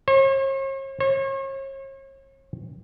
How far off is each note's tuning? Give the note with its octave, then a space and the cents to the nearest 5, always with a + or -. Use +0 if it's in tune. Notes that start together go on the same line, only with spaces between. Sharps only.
C#5 -45
C#5 -40